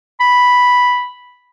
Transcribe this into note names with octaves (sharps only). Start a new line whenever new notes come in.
B5